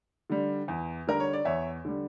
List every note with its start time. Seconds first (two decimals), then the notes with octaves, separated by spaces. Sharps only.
0.30 D3 G3
0.68 E2
1.07 D3 G3 A#4
1.20 C#5
1.33 D5
1.45 E2 C#5 E5
1.85 D3 G3